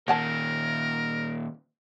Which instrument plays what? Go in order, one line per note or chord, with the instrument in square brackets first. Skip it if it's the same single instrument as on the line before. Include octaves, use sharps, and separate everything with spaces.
[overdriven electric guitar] A#2 D#3 [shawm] A#4 [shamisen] C#5 F#5 A5